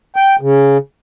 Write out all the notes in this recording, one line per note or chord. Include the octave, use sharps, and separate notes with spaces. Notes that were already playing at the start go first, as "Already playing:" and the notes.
G5
C#3